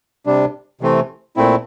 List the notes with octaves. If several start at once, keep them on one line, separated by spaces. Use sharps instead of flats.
C3 G3 D4
C3 E3 A3 C4
A#2 A3 C4 E4